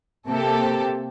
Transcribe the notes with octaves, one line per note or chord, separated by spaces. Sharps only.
C3 A#3 G4 A4